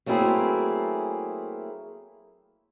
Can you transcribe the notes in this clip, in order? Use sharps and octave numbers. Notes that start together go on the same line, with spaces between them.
F#3 A3 A#3 C4 E4 G#4